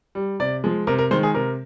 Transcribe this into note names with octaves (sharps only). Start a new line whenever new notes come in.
G3
C3 D5
F3 G#3
C3 A#4
A#4
D#3 G#3 C5
G#4
C3 A#4